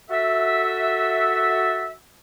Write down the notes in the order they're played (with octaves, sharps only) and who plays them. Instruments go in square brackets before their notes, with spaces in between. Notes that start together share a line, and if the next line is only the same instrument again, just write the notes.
[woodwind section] F#4 A4 E5